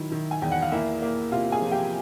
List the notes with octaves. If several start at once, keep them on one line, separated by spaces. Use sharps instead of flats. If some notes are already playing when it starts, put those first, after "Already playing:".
Already playing: D#3 F#3 E4
D#3
G#5
E2 G5
F#5
F5
A#3 E4 E5
A#3
C3 F4 F5
G#4 G#5
F3
G4 G5